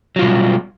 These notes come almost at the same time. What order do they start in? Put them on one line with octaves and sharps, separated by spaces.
F#3 F4 B2 G3